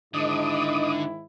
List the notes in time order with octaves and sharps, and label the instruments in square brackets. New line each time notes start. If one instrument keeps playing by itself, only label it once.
[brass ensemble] G#2 D#3 E4 [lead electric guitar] D3 [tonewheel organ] D#5 D6 D#6